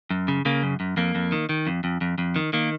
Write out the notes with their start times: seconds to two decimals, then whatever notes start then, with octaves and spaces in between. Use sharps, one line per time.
0.10 F#2
0.28 C#3
0.45 C#3 A#3
0.63 F#2
0.80 F#2
0.97 F2 A#3
1.15 F2
1.32 D#3
1.49 D#3
1.67 F2
1.84 F2
2.01 F2
2.18 F2
2.36 D#3
2.53 D#3 A#3